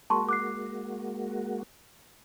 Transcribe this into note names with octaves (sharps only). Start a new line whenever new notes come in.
G#3 A#3 F#4 A5 C6 C#6
D6 F#6 C7